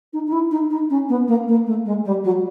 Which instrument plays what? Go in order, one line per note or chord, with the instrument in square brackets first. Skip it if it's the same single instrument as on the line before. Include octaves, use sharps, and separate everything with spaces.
[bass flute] D#4
D#4
E4
D#4
D#4
C#4
B3
A#3
A#3
A3
G#3
G3
F#3